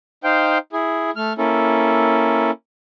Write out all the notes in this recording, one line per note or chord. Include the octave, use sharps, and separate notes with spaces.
D#4 C5 F5 G5
E4 G#4
A3 F6
A#3 C#4 E4 A4